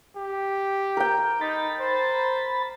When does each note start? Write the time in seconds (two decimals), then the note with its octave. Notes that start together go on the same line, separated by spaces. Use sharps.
0.17 G4
0.97 A#4 G5
1.41 D#4 B5 A6
1.80 C5